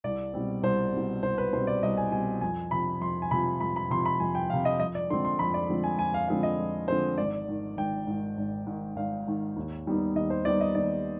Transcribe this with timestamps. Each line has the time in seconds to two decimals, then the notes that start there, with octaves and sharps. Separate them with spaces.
0.04 C2 D5
0.33 B2 G3 C4
0.63 C2 C5
0.92 B2 G3 C4
1.23 C2 C5
1.38 B4
1.53 B2 G3 C4 C5
1.67 D5
1.83 C2 D#5
1.97 G#5
2.12 B2 G3 C4 G#5
2.41 F2 G#5
2.71 C3 F3 B5
3.01 F2 C6
3.22 G#5
3.31 C3 F3 B5
3.60 F2 B5
3.76 B5
3.90 C3 F3 C6
4.06 B5
4.20 F2 G#5
4.35 G5
4.50 C3 F3 F5
4.65 D#5
4.79 F2 D#5
4.95 D5
5.10 D3 F3 G#3 C4 C6
5.25 C6
5.39 F2 B5
5.54 D5
5.69 D3 F3 G#3 C4
5.84 G#5
5.99 F2 G#5
6.14 F5
6.28 D3 F3 G#3 C4 F5
6.43 D#5
6.58 F2
6.88 D3 F3 G#3 C4 C5
7.18 G#1 D5
7.47 G#2 D#3
7.77 G#1 G5
8.07 G#2 D#3
8.37 G#1
8.67 G#2 D#3
8.96 G#1 F5
9.27 G#2 D#3
9.56 D#2
9.87 D#3 G3 B3 D#4
10.15 D#2 D#5
10.30 C5
10.45 D#3 G3 B3 D#4 D5
10.61 D#5
10.75 D#2 D5